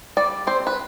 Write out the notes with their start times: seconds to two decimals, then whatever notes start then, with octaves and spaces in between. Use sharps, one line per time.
0.17 G3 D5
0.47 C4 C5
0.67 B4